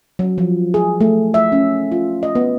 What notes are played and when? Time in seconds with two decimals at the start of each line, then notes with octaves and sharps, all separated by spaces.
0.19 F#3
0.38 F3
0.74 G#4
1.01 A3
1.34 E5
1.52 C#4
1.92 F4
2.23 D#5
2.35 B3